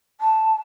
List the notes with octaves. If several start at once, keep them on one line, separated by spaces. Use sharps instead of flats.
A5